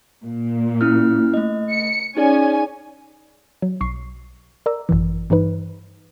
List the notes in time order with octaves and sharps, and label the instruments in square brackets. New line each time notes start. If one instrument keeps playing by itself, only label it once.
[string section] A#2
[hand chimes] C#4 E4 F6
A3 D#5
[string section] C#7
[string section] C#4 G#5 [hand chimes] D#4 G#4 D5
[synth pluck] F#3
B1 C#6 C7
A#4 D5 A#5 E6
G#1 F#2 E3
G2 E3 D#4 B4